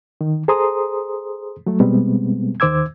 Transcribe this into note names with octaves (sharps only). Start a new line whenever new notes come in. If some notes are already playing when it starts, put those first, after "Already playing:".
D#3
G#4 A4 C5 A#5 C6 D#6
F#3 A3
B2 G3 G#3 B3 C4
D#2 D#3 C5 D6 E6 G#6